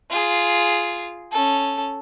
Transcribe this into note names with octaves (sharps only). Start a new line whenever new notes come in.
F4 G#4
C#4 A4